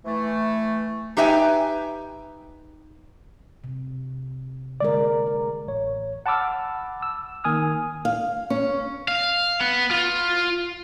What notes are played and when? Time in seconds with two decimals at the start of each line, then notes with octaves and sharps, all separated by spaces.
0.05 E3 A3
1.17 D#4 G4 B4 E5 G5 G#5
3.64 C3
4.80 D3 G#3 A#4 D5
5.67 A1 C#5
6.26 F#5 A5 B5 D6 E6 F6
7.02 E6
7.44 D#3 A#3 G#5 D#6 F6
8.05 F5
8.50 C#4
9.08 F5
9.61 B3
9.91 F4